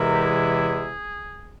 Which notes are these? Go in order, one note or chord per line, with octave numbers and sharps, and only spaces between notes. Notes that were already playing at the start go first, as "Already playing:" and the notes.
Already playing: E2 C3 E3 G#3 E4 A#4
G4
G#4